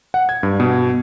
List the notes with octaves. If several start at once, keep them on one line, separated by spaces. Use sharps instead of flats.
F#5
G#6
G2
B2